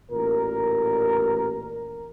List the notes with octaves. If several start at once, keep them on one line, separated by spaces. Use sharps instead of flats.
A1 A#2 A#4